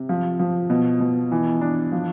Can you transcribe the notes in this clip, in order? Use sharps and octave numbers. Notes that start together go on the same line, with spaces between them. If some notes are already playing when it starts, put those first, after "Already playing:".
Already playing: C3
F3
F3
B2
B2
E3
D4
F3